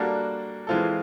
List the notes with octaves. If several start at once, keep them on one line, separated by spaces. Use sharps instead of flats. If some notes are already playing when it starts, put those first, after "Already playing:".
Already playing: G3 A#3 D4 F#4 A4
E3 G#3 C4 F4 A4